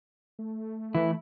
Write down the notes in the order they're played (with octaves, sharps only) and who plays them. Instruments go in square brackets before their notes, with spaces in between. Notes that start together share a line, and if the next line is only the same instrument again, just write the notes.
[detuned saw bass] A3
[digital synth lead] E3 [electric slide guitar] E4